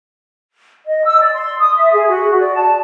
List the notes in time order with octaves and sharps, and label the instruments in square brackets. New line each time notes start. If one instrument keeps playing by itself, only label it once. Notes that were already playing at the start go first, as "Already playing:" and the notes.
[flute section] D#5
E6
D5
C6
D#6
E5
G#4
F#4
D5
A5